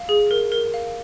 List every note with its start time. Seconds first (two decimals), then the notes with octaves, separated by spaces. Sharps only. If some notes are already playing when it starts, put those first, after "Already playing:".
Already playing: F5
0.09 G#4
0.31 A#4
0.52 A#4
0.74 F5